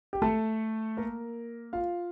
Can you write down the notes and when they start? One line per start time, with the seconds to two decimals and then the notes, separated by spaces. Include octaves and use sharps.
0.13 G4
0.22 A3 A4
0.97 A#3 A#4
1.73 F4 F5